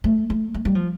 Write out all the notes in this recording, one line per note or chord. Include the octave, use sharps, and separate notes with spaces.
A3
A3
A3
G3
F3